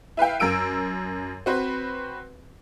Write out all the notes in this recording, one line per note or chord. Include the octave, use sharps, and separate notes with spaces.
E4 B4 F5 G5
F#2 A#4 E6 D7 D#7
C4 F#4 B4 C5